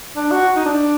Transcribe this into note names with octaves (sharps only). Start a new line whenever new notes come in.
D4
F#4
D#4
D4